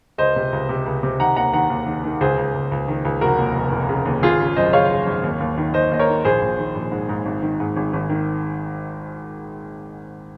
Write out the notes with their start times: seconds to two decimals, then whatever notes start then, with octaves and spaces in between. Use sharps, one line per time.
0.18 C#2 C5 D#5
0.36 C3
0.53 C#2
0.69 C3
0.86 C#2
1.03 C3
1.19 D#3 F#5 A#5
1.36 D#2 F#5 A#5
1.53 D#3 F#5 A#5
1.70 D#2
1.86 D#3
2.04 D#3
2.21 C#2 G#4 C5
2.38 C#2
2.54 C#2
2.72 C#2
2.88 D#3
3.05 C#2
3.21 F1 F#4 A#4
3.38 D#2
3.56 F1
3.72 F1
3.89 C#3
4.06 D#2
4.23 G#1 F4 G#4
4.40 C#3
4.56 F#2 C5 D#5
4.73 C#3 C#5 F5
4.90 C#3
5.07 G#1
5.23 D#2
5.40 D#2
5.58 D#3
5.74 D#2 C5 D#5
5.91 D#2 D#5
5.99 A#4 C#5
6.08 D#3
6.24 A#1 G#4 C5
6.42 A#1
6.58 D#3
6.75 A#1
6.92 G#2
7.09 G#2
7.26 G#1
7.42 D#3
7.60 G#2
7.76 G#1
7.93 G#1
8.09 D#3